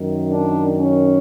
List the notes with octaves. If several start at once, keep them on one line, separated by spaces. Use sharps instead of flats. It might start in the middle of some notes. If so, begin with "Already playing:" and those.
Already playing: F#2 D#3
D4
C#4